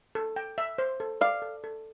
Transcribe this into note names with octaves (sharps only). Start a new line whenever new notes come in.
A4
G5
E5
C5
A4
D5 F5
A4
A4